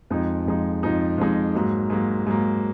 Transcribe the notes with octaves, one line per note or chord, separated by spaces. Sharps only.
F2 F3 G#3 D#4
F2 F3 G#3 D#4
F2 F3 G#3 D#4
F2 F3 G#3 D#4
G#2 F#3 A#3
G#2 F#3 A#3
G#2 F#3 A#3